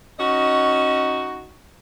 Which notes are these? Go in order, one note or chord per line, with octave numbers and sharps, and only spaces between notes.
C#4 D#4 F#4 D#5